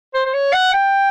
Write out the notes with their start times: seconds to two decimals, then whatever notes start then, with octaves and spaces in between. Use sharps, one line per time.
0.14 C5
0.25 C5
0.33 C#5
0.53 F#5
0.73 G5